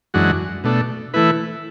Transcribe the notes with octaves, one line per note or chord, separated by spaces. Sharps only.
F#2 E3 G#3 D4 F#4
B2 A3 D4
E3 A3 E4 B4